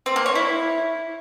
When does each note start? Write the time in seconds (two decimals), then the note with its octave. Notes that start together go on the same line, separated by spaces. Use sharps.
0.06 C4
0.16 A#3
0.26 C#5
0.35 E4